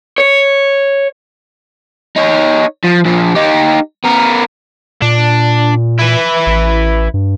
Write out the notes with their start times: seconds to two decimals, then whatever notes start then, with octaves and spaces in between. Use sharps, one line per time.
0.18 C#5
2.16 D#4 C#5
2.84 F3
3.06 A#2 F3
3.35 D#4 G4
4.05 B3 A#4
5.02 A#2 D4
5.99 E4 B4
6.47 A1
7.14 G2